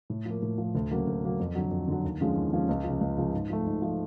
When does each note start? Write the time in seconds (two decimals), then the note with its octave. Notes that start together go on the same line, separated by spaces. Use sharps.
0.10 A2
0.26 F3 A#3
0.42 A2
0.58 F3 A#3
0.75 D2
0.91 C#3 F#3 A#3
1.07 D2
1.23 C#3 F#3 A#3
1.39 F2
1.55 D3 F#3
1.71 F2
1.88 D3 F#3
2.04 D#2
2.20 D3 F3 G#3 C#4
2.36 D#2
2.53 D3 F3 G#3 C#4
2.69 C#2
2.84 C#3 F3
3.01 C#2
3.17 C#3 F3
3.33 G#2
3.50 F3 A3
3.66 G#2
3.82 F3 A3